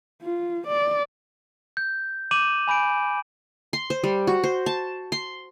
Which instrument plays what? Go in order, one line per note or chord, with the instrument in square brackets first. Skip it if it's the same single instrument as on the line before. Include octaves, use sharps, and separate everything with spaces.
[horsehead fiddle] F4
D5
[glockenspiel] G6
D6 G6 D#7 E7 F#7
G#5 B5 G6 D7
[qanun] C6
C5
G3
F#4
C5
A5
C6